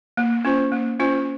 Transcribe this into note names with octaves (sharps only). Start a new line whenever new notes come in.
A#3
C#4 F4 C5
A#3
C#4 F4 C5